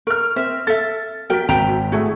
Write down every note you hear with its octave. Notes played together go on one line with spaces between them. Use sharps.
A#4 C#6 F6
C4 E5
A4 E5 A6
F#3 A#4 G5 B6
G#1 C4 G5 A#5
A2 A3 F#4 G#4